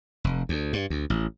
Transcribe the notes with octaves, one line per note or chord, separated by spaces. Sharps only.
F1
D2
G2
D2
A1